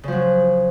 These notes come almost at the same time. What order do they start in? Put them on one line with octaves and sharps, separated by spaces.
C#3 F3 F#3